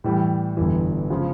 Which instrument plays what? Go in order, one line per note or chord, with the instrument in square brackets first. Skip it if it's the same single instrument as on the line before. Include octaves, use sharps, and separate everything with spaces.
[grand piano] A2 E3 G3
G1 G2 E3
C#3 F3 G#3